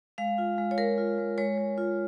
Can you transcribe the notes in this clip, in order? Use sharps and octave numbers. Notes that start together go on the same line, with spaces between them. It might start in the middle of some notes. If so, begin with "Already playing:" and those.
G#3 F5
F4
G#3
C#5
G#3 A#4
F4
G#3
G#3 C#5
G#3
F4